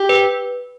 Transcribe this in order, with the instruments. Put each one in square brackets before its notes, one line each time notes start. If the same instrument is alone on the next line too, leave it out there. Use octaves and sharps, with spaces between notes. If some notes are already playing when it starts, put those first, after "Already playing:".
Already playing: [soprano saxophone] G4
[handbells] B4